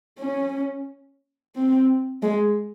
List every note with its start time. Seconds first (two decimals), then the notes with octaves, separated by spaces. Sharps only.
0.19 C#4
1.55 C4
2.23 G#3